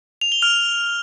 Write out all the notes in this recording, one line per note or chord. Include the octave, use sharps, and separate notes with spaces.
F7
G7
F6 F7